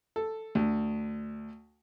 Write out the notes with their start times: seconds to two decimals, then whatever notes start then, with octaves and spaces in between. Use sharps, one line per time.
0.16 A4
0.55 D2